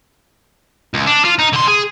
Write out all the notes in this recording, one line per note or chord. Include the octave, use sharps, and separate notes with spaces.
C#2
D4
F4
D#4
D3 C6
G#4